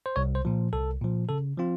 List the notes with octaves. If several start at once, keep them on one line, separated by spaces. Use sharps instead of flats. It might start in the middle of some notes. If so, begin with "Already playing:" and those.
C5
C2 C#5
C5
A#2 F3
C2 A4
A#2 F3
C#3 A4
F3 C4 F4